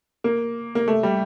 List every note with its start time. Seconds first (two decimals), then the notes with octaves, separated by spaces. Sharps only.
0.24 A#3
0.75 A#3
0.88 A3
1.03 G3